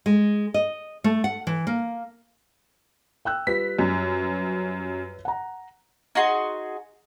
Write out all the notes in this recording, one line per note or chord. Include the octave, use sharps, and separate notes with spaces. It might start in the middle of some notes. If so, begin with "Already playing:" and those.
G#3
D#5
A3
F#5
E3
A#3
G5 E6 F#6
G3 F4 B4 B6
F#2
F#5 A#5
D#4 F#4 G#4 C6